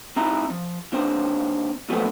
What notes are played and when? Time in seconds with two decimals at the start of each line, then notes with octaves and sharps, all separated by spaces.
0.16 C4 D#4 E4 A#5
0.50 F3
0.92 D#2 C4 D4 C5
1.89 A#2 F3 F#3 A3 B3 C4